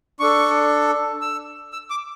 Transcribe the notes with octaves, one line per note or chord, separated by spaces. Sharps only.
D4 A4 C#6
E6
E6
D6